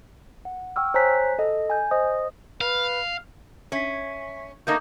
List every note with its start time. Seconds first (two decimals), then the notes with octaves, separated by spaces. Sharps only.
0.45 F#5
0.76 G5 C#6 E6 F6
0.94 C5 C#5 G#5 A#5 F#6 B6
1.38 A4 D#5
1.70 G#5 G6
1.91 C5 D#5 D#6
2.61 B4 F5
3.72 C#4 E5 B6
4.67 A3 A#3 D#4 D6 D#6 G6